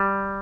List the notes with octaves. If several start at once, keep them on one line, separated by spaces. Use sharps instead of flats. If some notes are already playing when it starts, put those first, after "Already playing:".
Already playing: G3